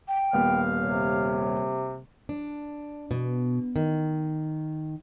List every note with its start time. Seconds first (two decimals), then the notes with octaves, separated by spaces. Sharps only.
0.08 G5
0.33 D#1 B3 F5
0.82 C3 C#5
2.29 D4
3.11 B2
3.76 D#3